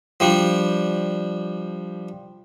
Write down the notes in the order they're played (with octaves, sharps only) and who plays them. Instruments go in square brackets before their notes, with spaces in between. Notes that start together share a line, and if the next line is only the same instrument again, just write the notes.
[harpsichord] F3 G3 D4